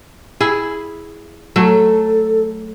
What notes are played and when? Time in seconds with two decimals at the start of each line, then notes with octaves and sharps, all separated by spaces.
0.41 E4 G#4
1.56 F#3 A3 A4